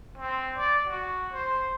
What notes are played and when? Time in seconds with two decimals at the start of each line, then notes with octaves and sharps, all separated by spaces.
0.18 C4
0.57 D5
0.87 F#4
1.32 C5